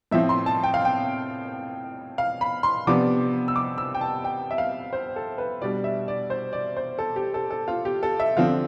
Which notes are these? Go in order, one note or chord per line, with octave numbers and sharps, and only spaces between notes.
A2 F3 C4 E5
C6
A5
G5
F5
G5
F5
B5
C6
C3 F3 B3 D4 D6
E6
D6
E6
G5
A5
G5
E5
F5
C5
A4
B4
B2 G3 D4 D5
E5
D5
C5
D5
C5
A4
G4
A4
A4
F4
G4
A4
E5
D3 F3 C4 F4